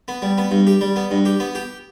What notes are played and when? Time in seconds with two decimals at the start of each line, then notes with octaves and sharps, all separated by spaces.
0.08 B3
0.22 G3
0.38 B3
0.51 G2
0.67 G4
0.81 G3
0.96 B3
1.11 G2
1.25 G4
1.40 B3
1.55 G4